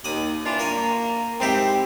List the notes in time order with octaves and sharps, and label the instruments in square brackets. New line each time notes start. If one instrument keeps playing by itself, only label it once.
[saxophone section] D#2 [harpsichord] D5 D#6
[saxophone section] E3 D4 F4
[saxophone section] A#3 [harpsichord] F4 C#5 G#5
[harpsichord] G#2 E4 G4 [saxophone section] C4